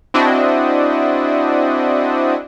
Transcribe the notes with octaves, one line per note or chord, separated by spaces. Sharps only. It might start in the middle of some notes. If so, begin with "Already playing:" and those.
C4 D4 E4 F#4 D#5